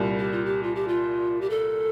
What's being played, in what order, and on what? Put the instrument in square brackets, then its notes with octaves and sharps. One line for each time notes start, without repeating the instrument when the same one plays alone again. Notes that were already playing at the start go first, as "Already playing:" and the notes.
Already playing: [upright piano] C2 A#2 G3
[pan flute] G4
F4
G4
F4
G4
F4
G4
A4